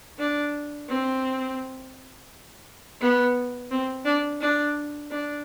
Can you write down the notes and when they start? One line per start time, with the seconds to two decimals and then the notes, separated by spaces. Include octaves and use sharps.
0.19 D4
0.89 C4
3.01 B3
3.71 C4
4.05 D4
4.41 D4
5.11 D4